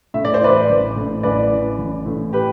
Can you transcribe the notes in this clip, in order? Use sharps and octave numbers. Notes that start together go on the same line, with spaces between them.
A2 E5
D5
C5
E3 B4 D5
A1
A2
A1 B4 D5
E3
A1
A2
G4 B4